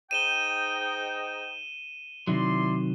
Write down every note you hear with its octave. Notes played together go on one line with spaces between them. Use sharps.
G#2 D#4 G5 D#7 E7 G7
C3 D#3 F#3 E4 D5 C6